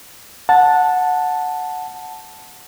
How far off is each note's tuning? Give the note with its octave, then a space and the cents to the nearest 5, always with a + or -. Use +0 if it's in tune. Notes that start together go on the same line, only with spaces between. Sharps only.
F#5 -15 A5 +0